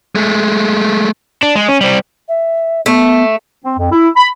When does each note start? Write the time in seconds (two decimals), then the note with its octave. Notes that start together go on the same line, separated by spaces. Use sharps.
0.15 G#3 A3
1.43 D4
1.55 G#3
1.68 C#4
1.81 G3 C4
2.28 E5
2.86 A3 B3
3.64 C4
3.78 F2
3.92 E4
4.16 B5